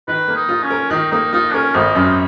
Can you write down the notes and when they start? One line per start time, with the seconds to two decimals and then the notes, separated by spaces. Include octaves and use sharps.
0.08 D#3 B4
0.28 A#3
0.35 D#4
0.49 F4
0.63 C#4
0.70 A#4
0.91 D#3 D#4
1.12 A#3 D#4
1.33 D#4 F4
1.53 C#4 A#4
1.74 G#1 D#4
1.95 F#2
2.09 D#4